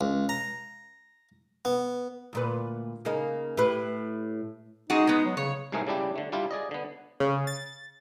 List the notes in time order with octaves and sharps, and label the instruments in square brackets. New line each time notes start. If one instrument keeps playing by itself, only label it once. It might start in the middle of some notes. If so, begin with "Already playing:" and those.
[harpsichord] C#2
A#5
B3
[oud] D2 A#2 B4
C#3 A#3 D#4
A2 G4 B4
[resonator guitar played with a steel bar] G#3 F#4 G#4 [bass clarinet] D#4
[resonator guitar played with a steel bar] G#3 B3
[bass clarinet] F#3
[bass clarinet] C#3 [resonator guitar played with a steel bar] C#5
[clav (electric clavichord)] C2 G#2 G#3 A3 G#4 A#4
C#3 G3 D4 E4 G4
D3 A3
G3 D4 E4 F4 G4
G#4 D5 D#5
D3 B3
[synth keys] C#3
A6